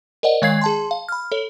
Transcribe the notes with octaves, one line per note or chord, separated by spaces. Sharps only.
A#4 C5 D5 D#5 F#5
D#3 G#3 C#5 F5 G#6 C7
G#4 A5 C6
F5
B5 F6
A4 C#5